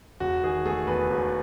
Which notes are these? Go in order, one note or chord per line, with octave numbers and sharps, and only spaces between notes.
E1 F#4
D#3 G#4
A3 G#4
E2 B4
E1